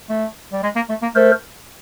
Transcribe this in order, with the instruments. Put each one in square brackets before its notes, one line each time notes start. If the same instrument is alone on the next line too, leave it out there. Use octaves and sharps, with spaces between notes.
[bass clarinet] A3
G3
G#3
A#3
A3
A#3
[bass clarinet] A3 [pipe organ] A#4 C5